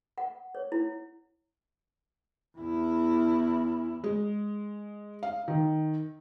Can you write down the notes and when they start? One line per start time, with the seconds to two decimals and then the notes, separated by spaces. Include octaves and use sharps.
0.18 F#5
0.55 C#5
0.72 E4
2.57 E2 E4
4.04 G#3
5.23 F5
5.48 D#3